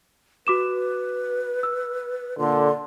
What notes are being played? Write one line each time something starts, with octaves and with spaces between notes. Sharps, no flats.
F#4 B4 D6 E7
E6
A#2 D3 C6